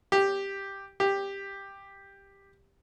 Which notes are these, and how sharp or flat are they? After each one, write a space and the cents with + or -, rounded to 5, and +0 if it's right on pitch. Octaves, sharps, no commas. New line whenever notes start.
G4 +5
G4 +10